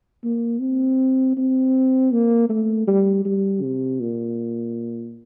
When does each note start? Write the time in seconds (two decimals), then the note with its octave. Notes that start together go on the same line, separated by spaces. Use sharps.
0.24 A#3
0.60 C4
1.37 C4
2.12 A#3
2.49 A3
2.87 G3
3.25 G3
3.62 C3
4.00 A#2